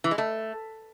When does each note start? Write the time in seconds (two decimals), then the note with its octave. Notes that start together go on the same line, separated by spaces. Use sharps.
0.04 E3
0.11 G#3
0.18 A3